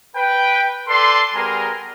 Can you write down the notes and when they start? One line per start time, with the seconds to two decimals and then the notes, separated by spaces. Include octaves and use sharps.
0.16 B4 G5
0.88 A4 B4 D5 C6
1.35 G3 B3 G#4 A#4 G#5 A#5